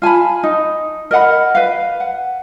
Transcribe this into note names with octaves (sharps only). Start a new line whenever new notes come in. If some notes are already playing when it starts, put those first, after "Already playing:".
F4 G#5 A5 B5
D#4
A#4 D#5 F#5 B5
B4 F5
F#5